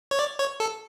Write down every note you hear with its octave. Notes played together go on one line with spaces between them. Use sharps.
C#5
D5
C#5
A4